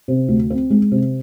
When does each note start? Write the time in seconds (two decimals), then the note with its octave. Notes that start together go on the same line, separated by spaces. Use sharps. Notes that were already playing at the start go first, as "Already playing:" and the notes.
0.08 C3
0.28 D2
0.50 C4
0.70 G#3
0.92 C3